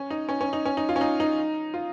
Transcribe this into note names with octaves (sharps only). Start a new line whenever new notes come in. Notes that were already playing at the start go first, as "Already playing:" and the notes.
Already playing: C#4
D#4
C#4
C#4
D#4
C#4
D#4
F4
C#4
D#4
D#4
F4